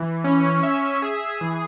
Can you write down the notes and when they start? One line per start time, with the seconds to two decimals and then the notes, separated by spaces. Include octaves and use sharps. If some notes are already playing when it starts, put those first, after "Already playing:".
Already playing: E3
0.24 C#4
0.63 E5
1.02 G#4
1.41 E3